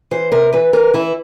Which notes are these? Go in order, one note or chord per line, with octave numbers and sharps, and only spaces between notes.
E3 C5
C3 A#4
E3 B4
E3 A#4
E3 E4